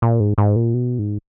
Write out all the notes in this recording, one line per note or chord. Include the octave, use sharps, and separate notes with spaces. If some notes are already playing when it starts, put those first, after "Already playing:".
A#2
G#2
G#2
A#2
B2
G#2